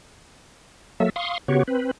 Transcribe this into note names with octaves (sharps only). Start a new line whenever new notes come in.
F#3 A#3 A4 E5
F5 C6 C#6 D#6
C#3 B3 F#4 G4 C#5
C4 B4